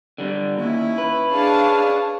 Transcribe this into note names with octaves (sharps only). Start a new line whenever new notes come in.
D3 G3
D#2 C#4 E4
B4
D4 G#4 C#5 F5 A5